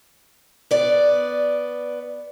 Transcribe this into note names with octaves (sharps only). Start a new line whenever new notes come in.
B3 D5